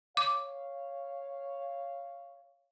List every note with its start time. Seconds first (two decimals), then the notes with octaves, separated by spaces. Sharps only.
0.17 C#5 F5 D6